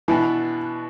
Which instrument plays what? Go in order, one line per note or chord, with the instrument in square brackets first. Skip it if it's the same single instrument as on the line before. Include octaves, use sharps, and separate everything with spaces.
[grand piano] B2 B3 D4 F#4 [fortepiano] E3